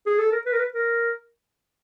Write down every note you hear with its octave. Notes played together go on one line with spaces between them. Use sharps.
G#4
A4
A#4
B4
A#4
B4
A#4